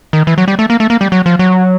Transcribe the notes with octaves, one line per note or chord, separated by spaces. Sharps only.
D#3
E3
F#3
G3
A3
A#3
A3
A#3
G3
F#3
F3
F#3